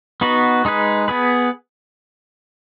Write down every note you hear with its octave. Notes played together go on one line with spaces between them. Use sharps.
B3 D#4 F#4 B4
G#3 D#4 G#4 B4
B3 G#4 B4